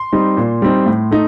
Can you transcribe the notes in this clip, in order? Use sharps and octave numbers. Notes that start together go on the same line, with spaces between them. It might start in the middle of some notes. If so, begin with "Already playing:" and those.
Already playing: C6
G3 C4 D#4
A#2
G3 C4 D#4
A2
A3 D#4